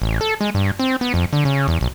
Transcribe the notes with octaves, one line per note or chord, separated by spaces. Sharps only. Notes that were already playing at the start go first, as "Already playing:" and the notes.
A1
A4
G#3
G2
C4
B3
F2
D3
C#3
E2
B1